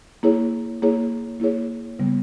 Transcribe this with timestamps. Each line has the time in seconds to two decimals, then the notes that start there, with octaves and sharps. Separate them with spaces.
0.23 A#3 E4 G#4 C#5
0.82 A#3 E4 G#4 C#5
1.40 A#3 E4 G#4 C#5
1.99 C#3 G3 B3